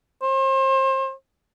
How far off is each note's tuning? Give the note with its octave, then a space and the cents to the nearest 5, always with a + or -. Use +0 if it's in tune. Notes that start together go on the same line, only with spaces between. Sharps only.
C5 +35